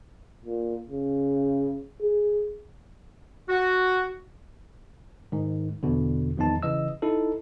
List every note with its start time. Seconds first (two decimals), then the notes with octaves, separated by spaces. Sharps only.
0.45 A#2
0.89 C#3
2.02 G#4
3.49 F#4
5.32 G#2 D#3
5.83 E2 B2 D3
6.37 A#1 E2 G2 D#3 D#4 A5
6.63 C#3 E3 D#5 E6
7.02 D#4 E4 A4